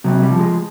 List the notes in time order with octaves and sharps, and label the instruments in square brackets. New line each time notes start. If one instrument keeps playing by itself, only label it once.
[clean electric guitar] C3 F#3
G3
F3
G#3